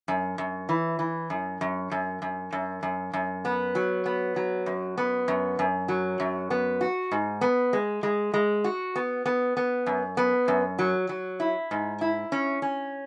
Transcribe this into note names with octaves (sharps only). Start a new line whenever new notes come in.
F#2
F#2
E3
E3
F#2
F#2
F#2
F#2
F#2
F#2
F#2
B3
F#3
B3
F#3
F#2
B3
F#2
F#2
F#3
F#2
B3
F#4
G#2
B3
G#3
G#3
G#3
F#4
B3
B3
B3
F#2
B3
F#2
F#3
F#3
E4
G#2
E4
C#4
C#4